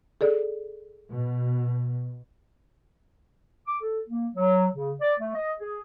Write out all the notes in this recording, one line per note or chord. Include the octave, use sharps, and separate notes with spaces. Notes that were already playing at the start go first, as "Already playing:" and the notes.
G#4 A4 D5
B2
D6
A4
A#3
F#3
C#3
D5
A3
D#5
G#4